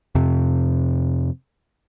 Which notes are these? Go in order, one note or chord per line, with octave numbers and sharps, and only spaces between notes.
F2 C3